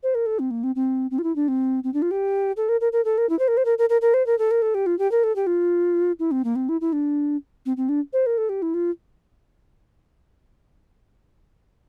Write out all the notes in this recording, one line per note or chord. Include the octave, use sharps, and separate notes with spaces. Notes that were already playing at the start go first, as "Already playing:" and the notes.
C5
A#4
A4
C4
A#3
C4
C4
C4
F4
E4
D4
C4
C4
D4
F4
G4
A4
A#4
A#4
A#4
A4
A#4
E4
C5
A#4
C5
A#4
A#4
A#4
A#4
C5
A#4
A4
A#4
A4
G4
F4
G4
A#4
A4
G4
F4
E4
C4
A#3
C4
E4
E4
D4
C4
C4
D4
C5
A#4
A4
G4
E4
F4